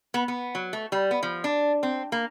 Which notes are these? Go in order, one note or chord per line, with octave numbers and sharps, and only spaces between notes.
B3
B3
F#3
A3
G3
B3
F3
D4
C4
A#3